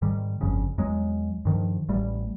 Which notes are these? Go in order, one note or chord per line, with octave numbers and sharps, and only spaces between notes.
G#2 D#3 G3
G1 F2 C#3
E2 F#3 G#3
G2 D#3 F3
A1 G3 A3